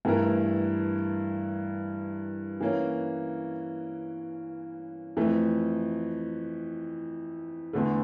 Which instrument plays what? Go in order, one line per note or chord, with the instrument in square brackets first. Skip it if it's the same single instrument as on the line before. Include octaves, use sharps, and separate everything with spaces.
[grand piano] G2 E3 A3 E4 A#4
E3 A#3 C#4
F2 E3 A3
E2 D3 A3